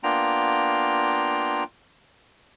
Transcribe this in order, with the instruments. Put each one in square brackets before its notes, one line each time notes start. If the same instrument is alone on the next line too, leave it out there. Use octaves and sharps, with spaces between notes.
[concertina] A#3 B3 D4 F4 G5 A#5